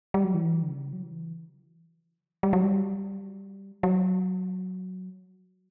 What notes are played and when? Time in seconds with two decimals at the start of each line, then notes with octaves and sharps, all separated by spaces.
0.14 G3
0.24 F#3
0.34 E3
0.62 D3
0.68 C#3
0.93 F#3
1.03 E3
2.43 G3
2.53 F#3
2.63 G3
3.83 F#3